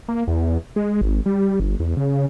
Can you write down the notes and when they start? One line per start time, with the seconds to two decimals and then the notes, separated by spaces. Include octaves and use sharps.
0.08 A#3
0.28 E2
0.76 G#3
1.01 G#1
1.26 G3
1.60 G1
1.80 E2
1.97 C#3